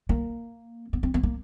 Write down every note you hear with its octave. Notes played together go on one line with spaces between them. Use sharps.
A#3
B3
C4
B3
A#3